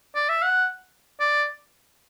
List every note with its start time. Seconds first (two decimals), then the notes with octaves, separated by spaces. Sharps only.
0.15 D5
0.29 E5
0.43 F#5
1.20 D5